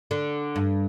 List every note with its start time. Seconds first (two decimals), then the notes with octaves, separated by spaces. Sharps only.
0.11 D3
0.56 G2